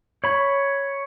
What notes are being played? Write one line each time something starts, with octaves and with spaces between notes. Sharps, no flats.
C#5 B5